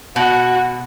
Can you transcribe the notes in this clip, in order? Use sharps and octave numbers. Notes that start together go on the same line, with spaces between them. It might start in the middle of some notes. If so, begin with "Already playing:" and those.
B2 F#4